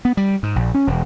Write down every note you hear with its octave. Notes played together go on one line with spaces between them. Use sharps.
B3
G3
G#2
A#1
C#4
E1